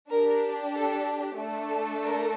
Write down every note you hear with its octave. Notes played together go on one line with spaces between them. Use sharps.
D4 G4 A#4
A4
A3 D4 A4
A#4